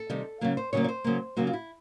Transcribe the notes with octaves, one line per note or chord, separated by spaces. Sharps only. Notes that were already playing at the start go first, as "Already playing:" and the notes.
Already playing: A4
C3 D#3 G3
C#3 F#3 A#3
C5
C#3 F#3 A#3 C#5
C#5
C5
C#3 F#3 A#3
C#3 F#3 A#3 F#4
F4
E4